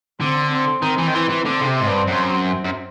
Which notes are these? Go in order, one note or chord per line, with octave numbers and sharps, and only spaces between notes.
D3 C4
C4
D#3 C4
E3
D#3
E3
E3
D3 C4
C#3
C3
G#2
G2
F#2
F#2